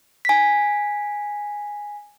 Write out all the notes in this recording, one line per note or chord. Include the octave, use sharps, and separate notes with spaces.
G#5 B6